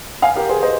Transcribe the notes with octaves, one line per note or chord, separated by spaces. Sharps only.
F5 G#5
G4 A#4
G#4 C5
C5 D#5